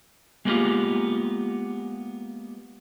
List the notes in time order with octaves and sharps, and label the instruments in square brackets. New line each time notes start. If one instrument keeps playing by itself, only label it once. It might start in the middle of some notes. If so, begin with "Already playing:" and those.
[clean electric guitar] G#3 A#3 B3 C#4 F4 G4